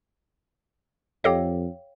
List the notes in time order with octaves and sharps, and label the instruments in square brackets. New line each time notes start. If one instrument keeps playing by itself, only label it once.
[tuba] F2 [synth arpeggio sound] G4 A4 D#5 [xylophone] C#5 F5 G5